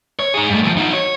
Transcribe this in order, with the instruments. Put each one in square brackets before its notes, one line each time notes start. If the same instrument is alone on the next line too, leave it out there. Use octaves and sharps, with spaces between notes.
[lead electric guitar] C#5
D#4 G#4
G2 A3
E2 F3
D#4 F#4
C#5